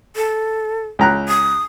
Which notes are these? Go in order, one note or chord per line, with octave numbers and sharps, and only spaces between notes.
A4
C#2 A#5 F#6
D#6